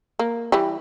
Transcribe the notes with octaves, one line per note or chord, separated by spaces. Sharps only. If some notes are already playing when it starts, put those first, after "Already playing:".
A#3
E3 G3